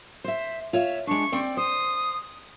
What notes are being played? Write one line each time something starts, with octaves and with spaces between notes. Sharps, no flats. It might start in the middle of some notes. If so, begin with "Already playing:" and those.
C5 E5
F4 C#5 E5
G#3 D4 C#6
C4 D5 G5
C5 D#6